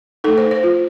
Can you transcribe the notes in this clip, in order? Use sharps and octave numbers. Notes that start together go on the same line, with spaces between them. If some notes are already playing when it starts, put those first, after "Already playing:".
A3 D#4 A4
C5
C5
F4